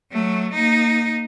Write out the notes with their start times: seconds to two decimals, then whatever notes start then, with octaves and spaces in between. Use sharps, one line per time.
0.11 F#3 A3
0.53 A#3 D#4